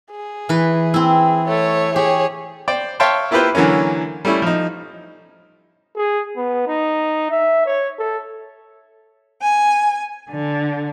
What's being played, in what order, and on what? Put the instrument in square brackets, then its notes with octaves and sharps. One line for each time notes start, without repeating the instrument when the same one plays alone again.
[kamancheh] G#4
[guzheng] E3 B4
C4 E4
[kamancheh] A3 C#5
[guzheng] G4 [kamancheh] G#4 C#5
[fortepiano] C5 D5 G5
C#5 E5 F5 G5 A5 C6
A#3 E4 F4 G4 B4 C5
D3 E3 F#3 A#3 C#4
G3 A3 C#4 E4
F3 D#4
[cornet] G#4
B3
D#4
E5
C#5
A4
[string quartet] G#5
D3